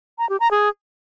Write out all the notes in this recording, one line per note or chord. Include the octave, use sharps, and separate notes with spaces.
A#5
G4
A#5
G#4